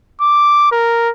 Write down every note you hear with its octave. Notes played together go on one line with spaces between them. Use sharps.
D6
A#4